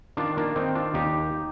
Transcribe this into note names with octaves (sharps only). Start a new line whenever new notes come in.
D#3 D4 F4
A#3 D4
D#3 C4 D#4
D4 F4
D#2 D#4 G4